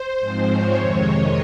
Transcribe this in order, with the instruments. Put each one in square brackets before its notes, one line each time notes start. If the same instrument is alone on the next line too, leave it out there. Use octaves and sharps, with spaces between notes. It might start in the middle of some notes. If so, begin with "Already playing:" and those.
Already playing: [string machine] C5
G#2 F3 G#3 C4
C#5
F2 C3 D#3 G#3
D#5